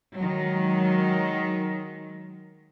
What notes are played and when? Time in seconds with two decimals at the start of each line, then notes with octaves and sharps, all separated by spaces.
0.16 D#3 F#3 G#3